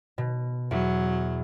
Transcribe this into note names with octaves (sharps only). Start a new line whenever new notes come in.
B2
E2 F#3